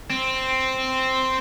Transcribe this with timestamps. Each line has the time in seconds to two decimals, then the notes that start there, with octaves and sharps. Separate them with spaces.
0.10 C4